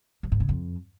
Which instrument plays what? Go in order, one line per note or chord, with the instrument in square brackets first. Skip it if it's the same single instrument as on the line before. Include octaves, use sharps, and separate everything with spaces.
[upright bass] G2
G#2
C#3
F2